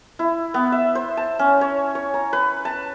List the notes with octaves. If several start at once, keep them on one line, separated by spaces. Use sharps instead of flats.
E4
B3
E5
C5
A5
C#4
C#5
C#5
A#5
B4
A5